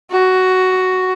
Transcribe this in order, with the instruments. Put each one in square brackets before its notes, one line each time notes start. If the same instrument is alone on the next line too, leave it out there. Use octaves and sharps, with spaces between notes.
[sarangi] F#4